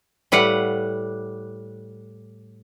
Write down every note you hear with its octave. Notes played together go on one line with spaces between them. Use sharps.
A2 G3 B4 F5 F#5